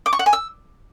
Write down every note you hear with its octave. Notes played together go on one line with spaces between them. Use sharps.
D6
C#6
F#5
G#5
E6